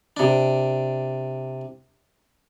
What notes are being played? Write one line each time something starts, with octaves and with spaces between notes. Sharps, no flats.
C3 D4